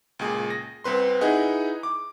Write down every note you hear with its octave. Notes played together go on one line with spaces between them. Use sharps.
C#2 A#2 G#4
A#6
C2 C4 B4 C6
D#4 E4 G#4 B4 F#5
D6